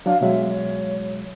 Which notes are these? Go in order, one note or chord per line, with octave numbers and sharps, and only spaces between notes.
F#3 D4 F5
B2 F#3 G#3 E5
C#5